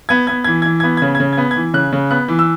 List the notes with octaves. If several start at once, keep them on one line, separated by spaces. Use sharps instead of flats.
B3 G#6
B3 G#6
E3 G#6
E3 G#6
B3 G#6
G#6
C#3
G#6
C#3
G#6
B3
G#6
E3
C#3 F#6
C#3
B3 F#6
E3
E6